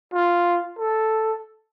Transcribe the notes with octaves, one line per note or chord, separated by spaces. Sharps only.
F4
A4